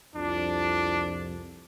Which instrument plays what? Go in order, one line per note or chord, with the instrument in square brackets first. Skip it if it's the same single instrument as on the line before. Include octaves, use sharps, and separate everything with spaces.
[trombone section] C2 F2 [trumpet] D4